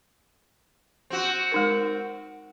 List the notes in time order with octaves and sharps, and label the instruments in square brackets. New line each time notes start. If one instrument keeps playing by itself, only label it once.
[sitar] C4 F#4
[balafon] G#3 D#4 A#4